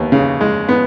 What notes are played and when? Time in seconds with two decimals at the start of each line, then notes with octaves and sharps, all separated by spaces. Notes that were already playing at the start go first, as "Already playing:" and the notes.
Already playing: D#2 B3
0.12 C#3
0.41 G#3
0.69 B3